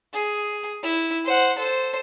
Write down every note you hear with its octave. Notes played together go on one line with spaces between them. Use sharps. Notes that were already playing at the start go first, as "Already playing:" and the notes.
G#4
E4
C5 F#5
A4 C5